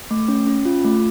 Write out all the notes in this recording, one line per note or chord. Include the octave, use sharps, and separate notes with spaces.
A3
C#4
C#4
F4
A3